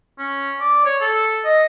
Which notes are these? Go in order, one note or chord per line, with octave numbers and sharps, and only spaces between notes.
C#4
D5
C#5
A4
D#5